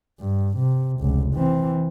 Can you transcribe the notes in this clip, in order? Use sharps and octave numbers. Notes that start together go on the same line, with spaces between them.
G2
C3
F1 C#2
E3 C4